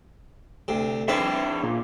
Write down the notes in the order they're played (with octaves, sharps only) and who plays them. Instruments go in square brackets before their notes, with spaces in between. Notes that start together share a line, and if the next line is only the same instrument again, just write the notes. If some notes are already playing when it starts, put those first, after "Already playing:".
[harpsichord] D2 C3
[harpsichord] C4 E4 B4 [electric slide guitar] D4 G#4 E5
[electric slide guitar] A#2